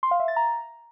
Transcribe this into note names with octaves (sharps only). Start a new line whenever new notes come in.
C6
F5
E5
A6
A#5